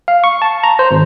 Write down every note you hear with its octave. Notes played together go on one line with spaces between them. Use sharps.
F5
C#6
A5
A#5
C5
G#1